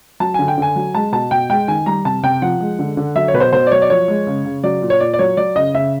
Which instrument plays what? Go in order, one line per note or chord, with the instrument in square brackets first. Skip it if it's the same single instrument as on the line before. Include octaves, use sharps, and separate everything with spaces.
[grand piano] F#3 A5
D3 G#5
G5
D3 G#5
F#3
G#3 A5
B2 A5
B2 G5
G#3 G5
D#3 G#5
G3 A#5
C3 A5
C3 G5
F3 F#5
G#3
D3
D3
F#3 E5
C#5
B2 B4
C5
B2 C5
D5
F#3 C#5
D5
F3 C#5
G#3
C#3
C#3
F#3 D5
A#2
C#5
A#2 D5
D5
F#3 C#5
F#3 D5
C#3 D#5
C#3 E5